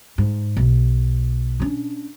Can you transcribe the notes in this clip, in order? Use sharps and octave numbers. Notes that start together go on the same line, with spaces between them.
G#2
B1
C#4 D4